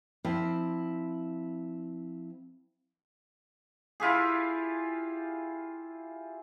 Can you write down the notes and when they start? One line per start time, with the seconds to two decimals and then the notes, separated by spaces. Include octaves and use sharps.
0.25 F3 C4 E4 G5
4.00 E4 F4 G4 G#4